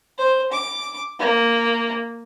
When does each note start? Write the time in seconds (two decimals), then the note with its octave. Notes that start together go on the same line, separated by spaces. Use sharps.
0.18 C5
0.53 D6
1.20 A#3